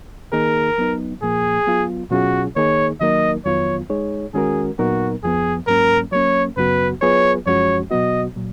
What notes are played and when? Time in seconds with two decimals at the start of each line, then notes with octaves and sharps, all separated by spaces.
0.33 D#3 A#3 D#4 G#4 A#4
0.78 F#3 B3 D#4
1.22 A#2 F3 A#3 G#4
1.67 F#3 B3 F4
2.11 B2 F#3 C#4 F4 F#4 G#4
2.56 D#3 A#3 D#4 G#4 C#5
3.00 D#3 F#3 A#3 D#4 A#4 D#5
3.45 F2 D#3 F#3 B3 F4 C#5
3.90 G#3 D#4 G#4 C#5
4.34 D#3 G#3 C#4 F#4 G#4 A#4
4.79 A#2 F#3 B3 D#4 F#4 A#4
5.23 F2 F3 B3 G#4
5.67 G#2 F#3 A#3 C#4 A#4
6.12 F#3 A#3 C#4 C#5
6.57 F#2 C#3 F#3 B3 F#4 B4
7.01 F#3 B3 F4 G#4 B4 C#5
7.46 F#2 F3 G#3 C#4 F#4 C#5
7.91 B2 F#3 B3 F#4 D#5
8.36 A#2 F#3